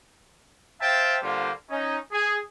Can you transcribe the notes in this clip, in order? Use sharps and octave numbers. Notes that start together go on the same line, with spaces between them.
C5 E5 F5 G5 A5
D3 G3 A#3 F4 C5
C#4 D#4
G#4